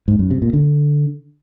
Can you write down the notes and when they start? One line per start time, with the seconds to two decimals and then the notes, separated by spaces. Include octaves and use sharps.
0.08 G#2
0.19 F#2
0.31 C3
0.42 A#2
0.53 D3